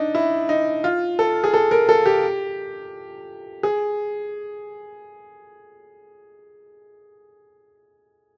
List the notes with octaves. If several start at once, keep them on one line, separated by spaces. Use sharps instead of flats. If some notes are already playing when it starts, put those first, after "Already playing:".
Already playing: D4 D#4
E4
D#4
F4
A4
G#4
A4
A#4
A4
G4
G#4